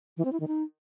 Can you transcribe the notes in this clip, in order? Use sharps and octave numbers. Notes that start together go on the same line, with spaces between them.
E3
C4
E4
D#3
D#4